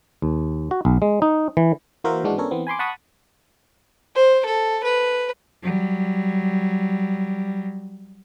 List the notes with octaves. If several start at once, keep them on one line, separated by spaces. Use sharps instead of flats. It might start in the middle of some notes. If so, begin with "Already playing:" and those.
D#2
F#4
B1
G#3
D#4
E3
E3 A#3 F#4 A#4 C5 E5
G#2 E3 G#3 D4 F#4
B3 C#4 D4 A4 A#4 C#5
E3 B3 C4
G#5 B5 C6 D6
F#5 A5 B5 C#6 D#6
C5
A4
B4
F#3 G3